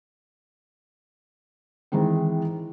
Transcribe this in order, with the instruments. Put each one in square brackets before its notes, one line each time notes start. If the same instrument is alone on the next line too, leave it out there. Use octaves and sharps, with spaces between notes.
[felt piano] D#3 E3 G#3 C4